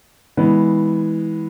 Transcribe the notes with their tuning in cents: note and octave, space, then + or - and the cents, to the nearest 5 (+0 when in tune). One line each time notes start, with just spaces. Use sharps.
E3 -25 G#3 -10 B3 +0